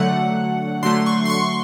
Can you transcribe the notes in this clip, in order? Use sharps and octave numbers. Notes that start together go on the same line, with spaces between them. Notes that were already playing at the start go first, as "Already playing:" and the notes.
Already playing: D3 F#3 A3 F#5
D3 F#3 A3 C6
C#6
C6
C#6